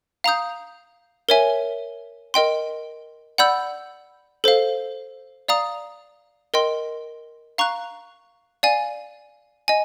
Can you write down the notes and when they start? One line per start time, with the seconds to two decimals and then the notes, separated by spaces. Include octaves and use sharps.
0.24 F5 A#5 D#6 G6
1.29 A#4 C#5 E5 G#5
2.34 A#4 D#5 G5 C6
3.38 D5 F#5 B5 E6 G6
4.44 A4 C5 F5
5.48 D5 F5 A#5 D#6
6.54 A#4 D#5 G5 C6
7.58 F5 A#5 C#6 F#6
8.63 D5 F5 G#5
9.68 D#5 G#5